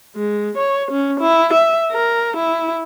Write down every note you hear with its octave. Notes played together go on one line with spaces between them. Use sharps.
G#3
C#5
C#4
E4
E5
A#4
E4